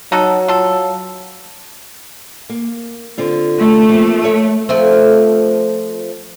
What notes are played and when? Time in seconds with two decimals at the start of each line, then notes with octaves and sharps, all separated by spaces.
0.12 F#3 D#4 F#4 A4
0.48 F4 A4
2.50 A#3
3.18 D3 C4 F4
3.59 A3
3.89 F3 A#3 C4
4.23 A4 C#5 E5
4.69 F3 A3 C4